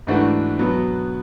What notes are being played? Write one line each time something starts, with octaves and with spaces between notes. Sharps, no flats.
G#2 E3 A3 D4 F#4
B2 F#3 B3